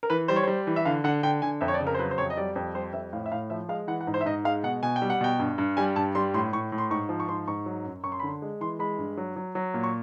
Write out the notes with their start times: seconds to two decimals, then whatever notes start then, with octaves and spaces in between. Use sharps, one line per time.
0.03 A#4
0.10 E3 B4
0.28 G3 C5
0.36 C#5
0.43 G3 C5
0.67 E3
0.76 E5
0.85 D3 F5
1.04 D3 F#5
1.23 D3 G5
1.42 D3 G#5
1.61 F2 E5
1.68 C#5
1.74 D5
1.80 C#3
1.87 A#4
1.94 C5
1.99 F#3 B4
2.11 C5
2.18 F2 C#5
2.30 D#5
2.37 G3 D5
2.56 F2
2.74 G3 C5
2.93 F2 E5
3.13 A2 F5
3.26 E5
3.32 A2 F5
3.50 F3 E5
3.69 G#3 F5
3.87 E3 F#5
4.01 F#5
4.07 G#2
4.14 C5
4.21 E5
4.26 G#2 D#5
4.44 G#3 F5
4.63 B2 F#5
4.83 B2 G#5
4.96 G5
5.02 G3
5.10 F#5
5.21 B2 G5
5.39 G2
5.58 G2
5.77 G3 G#5
5.96 G2 A5
6.15 G3 C6
6.34 A2 C6
6.53 A2 C#6
6.72 A2
6.78 C6
6.91 G#2 C#6
7.09 F3
7.20 C#6
7.28 G#2 C6
7.48 G#2 C#6
7.66 F#3
7.85 F#2
8.03 F#2 C#6
8.12 C6
8.20 B5
8.23 D3 C6
8.42 G#3
8.61 E3 C6
8.79 G#3 B5
8.98 G2
9.17 F#3
9.36 F#3
9.55 F#3
9.74 A#2
9.84 C#6